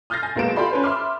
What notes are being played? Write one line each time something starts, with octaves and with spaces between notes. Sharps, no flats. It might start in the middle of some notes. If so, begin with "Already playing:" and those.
D#6 F6 G6 A6 A#6 C7
G#5 A#6
B1 G#3 A#3 B3 D7 E7
F4 G4 A4 D5 B5 C6
C#4 B4 C5
E5 B5 C6 D6 F6